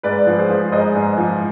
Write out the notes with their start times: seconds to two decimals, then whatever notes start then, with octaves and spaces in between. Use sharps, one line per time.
0.03 G#2 B4 D5
0.27 F3
0.38 G#4 C5
0.49 F3
0.72 G#2 C5 D#5
0.95 G#2
1.18 F3